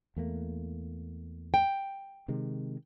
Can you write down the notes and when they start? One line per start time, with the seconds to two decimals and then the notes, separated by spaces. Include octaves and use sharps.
0.16 E2 A3 A#3
1.54 G5
2.28 C3 D#3 G#3